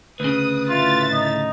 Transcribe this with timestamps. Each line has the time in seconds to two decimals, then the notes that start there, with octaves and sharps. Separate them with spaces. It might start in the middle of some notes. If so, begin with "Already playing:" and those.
0.20 D2 C#3 B4 D#6
0.69 A2 F4 E5 A6
1.12 D#4